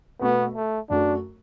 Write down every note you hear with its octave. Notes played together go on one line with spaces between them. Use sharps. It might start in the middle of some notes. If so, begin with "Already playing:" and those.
B2 A3 B3 F#4 B4
A3
F#2 F#3 A3 D4 F#4